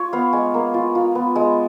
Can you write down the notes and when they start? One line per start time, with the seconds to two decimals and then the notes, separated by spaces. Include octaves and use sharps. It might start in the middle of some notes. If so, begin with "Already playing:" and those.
Already playing: F4 C#5
0.13 B3 F5
0.33 G#3 G#5
0.54 A#3
0.74 F4
0.95 F4
1.15 B3
1.35 G#3